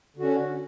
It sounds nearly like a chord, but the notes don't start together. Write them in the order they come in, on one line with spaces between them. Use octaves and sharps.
D3 F#4 C#4